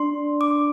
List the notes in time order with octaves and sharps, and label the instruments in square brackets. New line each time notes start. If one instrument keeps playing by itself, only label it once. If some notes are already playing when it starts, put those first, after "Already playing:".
Already playing: [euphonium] D4 [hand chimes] C6
[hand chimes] D6